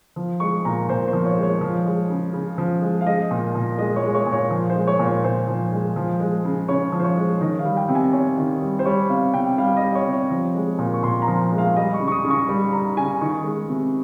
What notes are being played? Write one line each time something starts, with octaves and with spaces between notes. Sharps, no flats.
F3
G#3 C#6
A#2 A#5
A#2 C5
C5
F3
C#5
G#3
C#5
F3
G#3
C#3
C#3
F3
G#3
F5
G#3 D#5
A#2
A#2
G#3 D#5
C#5
G#3
C#5
A#2
C#5
F3
C5
G#3
C#5
A#2
C#5
A#2 C5
F3
G#3
F3
G#3
C#3
C#3 C#5
F3
C5
C#5
G#3
D#3 D#5
F5
G3
G5
C3
G#5
C3 C#5
D#3
G3
C5
G3 C#5
C3 F5
C3 G5
G3 F5
D#5
G3
C#5
C3
C#5
F3
G#3
A#2
C#6
A#2 C6
A#5
F3
G#3
F5
G3 D#5
C#6
C#3
C#6
D#6
C#3
C#6
G3
G3 A#5
C#3 G#5
D#3 C#6
G#3
C3